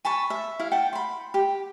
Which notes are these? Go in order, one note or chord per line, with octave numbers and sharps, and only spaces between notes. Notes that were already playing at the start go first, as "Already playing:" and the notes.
G#5 A5 B5 C#6
E5
E4 F5
F#5 G5 A5
B5 C6
G4